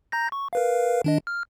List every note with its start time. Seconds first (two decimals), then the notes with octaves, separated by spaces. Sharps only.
0.12 A#5 G6 A#6
0.32 C#6
0.53 A#4 B4 F5
1.04 D#3 D4 D#5
1.27 F6